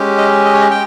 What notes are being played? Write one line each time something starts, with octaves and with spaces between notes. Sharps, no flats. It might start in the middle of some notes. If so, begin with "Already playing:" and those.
Already playing: G#3 C#4 G4
D#5
D#5
C#5
D#5
G5